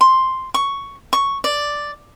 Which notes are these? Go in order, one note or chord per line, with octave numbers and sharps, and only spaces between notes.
C6
C#6
C#6
D5